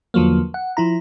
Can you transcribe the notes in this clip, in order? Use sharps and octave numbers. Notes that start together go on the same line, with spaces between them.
E2 D3 F3 F#3 A#3
F#5
F3 E4 A#5